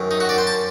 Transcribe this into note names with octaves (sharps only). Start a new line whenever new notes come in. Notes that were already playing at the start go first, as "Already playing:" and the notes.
Already playing: F#2 D#3
D#4
F#4
D5
C5
A5